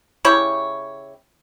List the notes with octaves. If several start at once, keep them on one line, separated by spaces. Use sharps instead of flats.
C#3 E4 G4 C#5